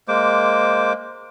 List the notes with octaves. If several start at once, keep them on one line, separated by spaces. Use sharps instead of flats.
G#3 A#3 C5 D6